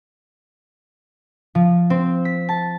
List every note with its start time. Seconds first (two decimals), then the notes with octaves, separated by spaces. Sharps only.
1.55 F3
1.90 C4
2.25 B6
2.49 A5